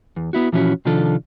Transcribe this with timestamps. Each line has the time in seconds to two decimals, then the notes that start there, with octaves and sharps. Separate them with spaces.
0.16 E2
0.33 B3 E4 F#4
0.52 A#2 E3 F3 C#4 E4 F#4
0.85 C3 D#3 F3 D4 F4 A4